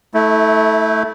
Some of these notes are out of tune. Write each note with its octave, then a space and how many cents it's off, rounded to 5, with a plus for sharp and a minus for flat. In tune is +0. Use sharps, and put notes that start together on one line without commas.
A3 +0 E4 -30